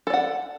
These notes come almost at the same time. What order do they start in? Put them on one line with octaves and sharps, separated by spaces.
A4 D5 F#5